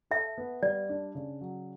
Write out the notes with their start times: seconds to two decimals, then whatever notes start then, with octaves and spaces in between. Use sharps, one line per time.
0.11 A4 E5
0.38 B3
0.62 G3 D5
0.89 D4
1.15 C#3
1.41 F#3